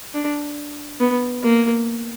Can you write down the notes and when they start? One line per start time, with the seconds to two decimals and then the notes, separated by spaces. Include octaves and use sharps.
0.14 D4
1.00 B3
1.43 A#3